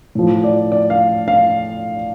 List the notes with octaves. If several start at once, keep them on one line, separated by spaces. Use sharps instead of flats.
A2 F3
D5
D5
F5
F5